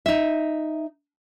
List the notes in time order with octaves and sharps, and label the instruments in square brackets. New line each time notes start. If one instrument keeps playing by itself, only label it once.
[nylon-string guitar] D#4 E5